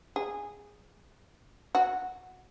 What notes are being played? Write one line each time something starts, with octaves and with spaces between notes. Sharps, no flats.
G#4
F#4